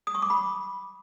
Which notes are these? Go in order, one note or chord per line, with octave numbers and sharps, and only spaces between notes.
D#6
C#6
D6
B5